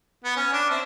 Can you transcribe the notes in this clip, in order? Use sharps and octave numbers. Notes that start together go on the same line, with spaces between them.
B3
C#4
D4
C4 E5